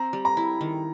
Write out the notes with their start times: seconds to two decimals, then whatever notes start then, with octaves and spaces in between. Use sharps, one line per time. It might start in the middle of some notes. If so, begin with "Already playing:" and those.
Already playing: C4 A#5
0.13 G3
0.25 A#5
0.37 E4
0.61 D#3